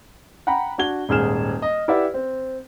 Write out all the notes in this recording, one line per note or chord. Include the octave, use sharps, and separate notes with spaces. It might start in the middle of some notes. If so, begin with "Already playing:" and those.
F#5 G5 A#5 B5
D4 F#4 G#6 G7
D#1 G#2 G#4 F6 E7
D#5
E4 G4 B4 D5 E5 F#5
C4